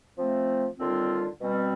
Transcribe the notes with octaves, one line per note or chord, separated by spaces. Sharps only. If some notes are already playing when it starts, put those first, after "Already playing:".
F3 A3 C4
D#2 D3 G3 C4 F4
B2 G3 C4